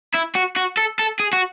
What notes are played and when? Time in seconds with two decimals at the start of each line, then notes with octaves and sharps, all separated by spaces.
0.15 E4
0.36 F#4
0.57 F#4
0.77 A4
0.99 A4
1.20 G#4
1.33 F#4